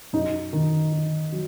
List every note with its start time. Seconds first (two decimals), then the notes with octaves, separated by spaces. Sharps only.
0.13 F#2 D#4
0.53 D#3
0.92 D#3
1.32 F#3